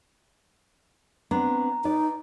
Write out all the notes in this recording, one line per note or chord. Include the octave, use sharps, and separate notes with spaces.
B3 C4 D4 A#5
D#4 B4 D5